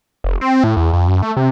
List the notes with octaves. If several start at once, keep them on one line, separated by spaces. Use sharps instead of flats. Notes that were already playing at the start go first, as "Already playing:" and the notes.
F1
C4
A2
E2
F2
F#2
A3
C3